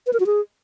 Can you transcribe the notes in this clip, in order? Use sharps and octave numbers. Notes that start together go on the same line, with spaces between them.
B4
A#4
F#4
G#4